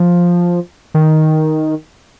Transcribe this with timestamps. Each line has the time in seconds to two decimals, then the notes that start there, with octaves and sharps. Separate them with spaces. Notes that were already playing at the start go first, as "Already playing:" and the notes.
Already playing: F3
0.94 D#3